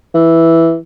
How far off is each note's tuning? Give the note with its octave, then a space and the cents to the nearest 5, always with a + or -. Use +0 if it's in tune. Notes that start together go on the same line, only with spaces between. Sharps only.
E3 +0